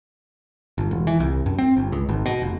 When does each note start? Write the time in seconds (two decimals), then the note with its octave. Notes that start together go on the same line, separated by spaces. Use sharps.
0.78 G1
0.91 E1
1.07 E3
1.20 C2
1.46 F#2
1.59 C4
1.77 G1
1.92 C#2
2.09 G#1
2.26 B2
2.42 F1